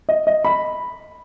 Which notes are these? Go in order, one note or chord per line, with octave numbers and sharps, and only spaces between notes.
D#5
D#5
B5